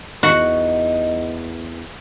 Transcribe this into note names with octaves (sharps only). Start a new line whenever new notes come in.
E2 D#4 F#4